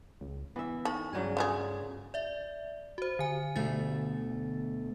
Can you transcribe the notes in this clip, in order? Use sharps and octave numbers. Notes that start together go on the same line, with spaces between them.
C#2
E3 B3 E5
D#4 A4 C#6
G2 C#3 F#3 B3 B4 D5 G#6
A3 F4 G#4 D5 C6
D5 E5
F#4 C5
D3 G#5
D2 B2 D3 A3 A6